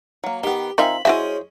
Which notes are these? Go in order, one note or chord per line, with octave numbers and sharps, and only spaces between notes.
F#3 A#3
D#3 B3 G4
D#3 C4 D#4 F4 E5 G#5 B5
G#3 C#4 E4 F#4 G#4 C5 E5